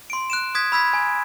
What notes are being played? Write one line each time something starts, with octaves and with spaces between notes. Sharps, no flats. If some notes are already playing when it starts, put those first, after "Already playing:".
C6 D7
F#6 D7 E7
D#6 F#6 G#6 B6
B5 E6 G#6 B6
G#5